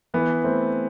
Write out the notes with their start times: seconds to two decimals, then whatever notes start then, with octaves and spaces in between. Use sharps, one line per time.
0.14 E3 B3
0.44 A3 C4